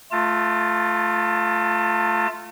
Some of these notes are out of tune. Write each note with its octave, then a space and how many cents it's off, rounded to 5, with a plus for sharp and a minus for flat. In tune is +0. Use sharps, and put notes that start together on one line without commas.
A3 -10 F4 +0 A5 +30